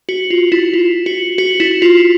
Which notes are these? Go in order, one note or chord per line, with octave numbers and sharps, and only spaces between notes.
F#4
F4
E4
F4
F#4
F#4
E4
F4